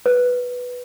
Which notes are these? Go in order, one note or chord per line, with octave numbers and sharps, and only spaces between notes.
B4